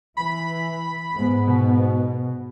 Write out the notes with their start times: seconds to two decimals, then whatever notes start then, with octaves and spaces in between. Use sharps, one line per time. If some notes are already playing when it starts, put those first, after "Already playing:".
0.17 E3 B5
1.12 G#2 B3
1.47 B2